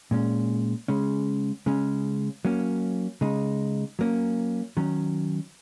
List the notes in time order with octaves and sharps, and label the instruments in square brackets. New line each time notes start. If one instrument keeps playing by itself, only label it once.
[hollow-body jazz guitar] A#2 G#3 C#4
C#3 G#3 C#4
C#3 G#3 C#4
F#3 A#3 C#4
C#3 G#3 D#4
F#3 A#3 C#4
D#3 F#3 C#4